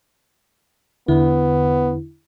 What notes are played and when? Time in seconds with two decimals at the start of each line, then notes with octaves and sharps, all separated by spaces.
1.08 E2 D3 B3 E4